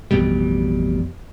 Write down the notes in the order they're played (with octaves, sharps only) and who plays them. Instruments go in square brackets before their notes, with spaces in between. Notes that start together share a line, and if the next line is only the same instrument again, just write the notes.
[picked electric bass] A1 F2 B2 G3